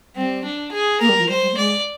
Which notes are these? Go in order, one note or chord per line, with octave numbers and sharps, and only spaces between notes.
G3 C4
D4
G#4
A#3 A#4
G3
F3
G3 C5
G3
A#3
G#3 D5